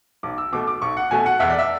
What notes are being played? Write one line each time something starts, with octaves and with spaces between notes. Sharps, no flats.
B1 D6
E6
B2 A3 D6
D6
B1 C#6
F#5
B2 A3 G#5
F#5
E2 E5
D5
E5